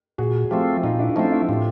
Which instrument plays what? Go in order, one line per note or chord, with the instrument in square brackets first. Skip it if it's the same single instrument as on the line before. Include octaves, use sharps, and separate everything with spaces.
[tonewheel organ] A#2 [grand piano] F#4 G#4
[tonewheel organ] F3 A3 C4 [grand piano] F4 G4
[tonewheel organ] A#2 [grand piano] D#4 F4
[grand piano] D4 E4
[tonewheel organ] F3 A3 C4 [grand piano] C#4 D#4
[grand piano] D4 E4
[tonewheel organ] A2 [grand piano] F4 G4